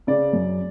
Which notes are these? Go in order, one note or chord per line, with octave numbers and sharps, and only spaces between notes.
C#3 D5
F#2